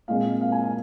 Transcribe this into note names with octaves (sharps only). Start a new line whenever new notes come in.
A#2 G#3 C4 F5
F5
G#5
G#5